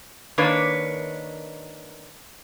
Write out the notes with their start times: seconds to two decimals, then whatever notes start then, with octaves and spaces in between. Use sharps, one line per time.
0.38 D#3 A#3 D4 B4 C#5